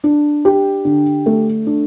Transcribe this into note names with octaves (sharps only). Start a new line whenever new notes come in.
D4
G4
D3
A3
D4